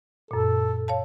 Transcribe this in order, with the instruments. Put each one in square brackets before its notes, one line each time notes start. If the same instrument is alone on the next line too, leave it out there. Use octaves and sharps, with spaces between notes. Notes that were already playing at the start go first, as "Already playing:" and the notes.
[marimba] F#2 A#2 [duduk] A4
[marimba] C#5 F5 A5